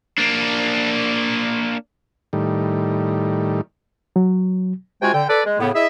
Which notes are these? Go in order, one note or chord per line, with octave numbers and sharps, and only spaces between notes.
A#3 D4
A2 D#3 G3
F#3
C3 G#3 F4 F#4 G5 G#5
D3 G5
A4 B4 D5
G#3
A2 C#3 B3
E4 G#4 D#5 E5